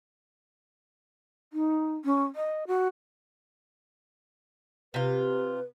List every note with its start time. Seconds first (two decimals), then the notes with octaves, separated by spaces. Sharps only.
1.53 D#4
2.05 C#4
2.35 D#5
2.67 F#4
4.94 C3 F4 B4